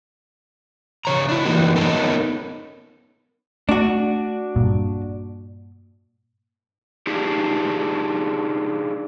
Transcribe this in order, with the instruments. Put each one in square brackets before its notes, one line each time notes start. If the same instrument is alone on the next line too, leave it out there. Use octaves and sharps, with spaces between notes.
[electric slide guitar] C#3 C#5 A#5
D4 E4
E3 A#3 D#4 F#4 G4
B3 C#4 D#4 A4 A#4
[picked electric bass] A3 [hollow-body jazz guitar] D4 F#4
[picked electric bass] G2 A#2
[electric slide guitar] D4 D#4 F4 G4 G#4